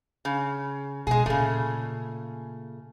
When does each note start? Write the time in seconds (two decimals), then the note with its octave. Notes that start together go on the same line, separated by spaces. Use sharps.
0.25 C#3
1.07 B2 G#3 G#4
1.26 A#2 C#3 A3